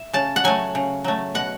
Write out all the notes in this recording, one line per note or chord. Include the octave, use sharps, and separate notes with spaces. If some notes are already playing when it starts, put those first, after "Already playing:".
Already playing: E5
C#3 A5
F#5
F#3 A3 G#5
C#3
F#3 A3
B2 F#5